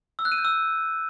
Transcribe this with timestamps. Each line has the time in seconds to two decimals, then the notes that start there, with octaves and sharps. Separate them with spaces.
0.19 E6
0.25 F#6
0.32 D#7
0.38 G6
0.45 E6